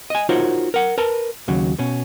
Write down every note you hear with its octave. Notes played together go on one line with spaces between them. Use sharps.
D#5 G#5
D#4 F4 F#4 A#4 C5 C#5
A#4 F#5
A#4 B4 A5
D#2 C#3 F#3
B2 C#4